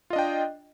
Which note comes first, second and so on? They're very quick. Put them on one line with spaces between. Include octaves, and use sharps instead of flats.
F4 D#5 D4 G5